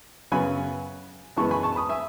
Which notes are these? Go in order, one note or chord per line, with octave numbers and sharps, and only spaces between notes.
F#2 C#3 F#3 B3 G#5 B5
F#2 E3 G#3 B3 A5 C#6
G#5 B5
A5 C#6
B5 D#6
E5 G#5